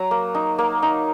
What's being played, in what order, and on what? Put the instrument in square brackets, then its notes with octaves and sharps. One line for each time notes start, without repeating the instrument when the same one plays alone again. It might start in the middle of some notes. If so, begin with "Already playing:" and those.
Already playing: [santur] F#3 A#5
A#3
D#4
A#3
D#4